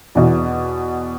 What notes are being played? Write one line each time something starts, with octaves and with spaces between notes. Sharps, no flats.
E2 B2